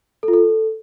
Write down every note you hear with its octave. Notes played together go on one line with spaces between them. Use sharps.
A4
F4
A4